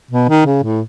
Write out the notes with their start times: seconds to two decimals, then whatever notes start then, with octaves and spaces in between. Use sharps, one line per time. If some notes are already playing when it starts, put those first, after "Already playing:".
0.11 B2
0.29 D#3
0.46 C#3
0.63 A2